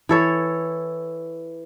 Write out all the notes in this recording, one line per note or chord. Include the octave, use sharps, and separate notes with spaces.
E3 A4 C#5